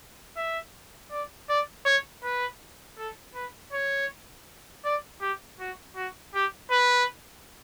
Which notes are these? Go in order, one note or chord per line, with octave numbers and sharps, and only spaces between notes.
E5
D5
D5
C#5
B4
A4
B4
C#5
D5
G4
F#4
F#4
G4
B4